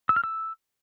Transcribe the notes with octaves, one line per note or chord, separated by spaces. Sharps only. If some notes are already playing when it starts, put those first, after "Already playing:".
E6
F6
E6